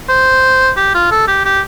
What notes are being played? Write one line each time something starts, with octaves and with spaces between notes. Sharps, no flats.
C5
G4
F4
A4
G4
G4